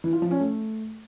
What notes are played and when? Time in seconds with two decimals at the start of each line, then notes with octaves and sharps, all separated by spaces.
0.04 E3
0.13 F4
0.22 F3
0.31 C#4
0.40 A3